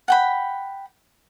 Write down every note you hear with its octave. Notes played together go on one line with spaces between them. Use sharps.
F#5 G5 B5